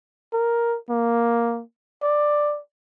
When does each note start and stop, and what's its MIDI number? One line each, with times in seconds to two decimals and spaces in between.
0.33 0.77 70
0.89 1.62 58
2.02 2.60 74